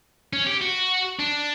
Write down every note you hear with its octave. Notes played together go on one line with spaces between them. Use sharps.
C#4
G4
F#4
D4